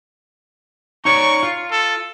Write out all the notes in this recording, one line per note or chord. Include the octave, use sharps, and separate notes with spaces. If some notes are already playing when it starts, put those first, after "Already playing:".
D#4 C#5 D5 C#6
F4
A4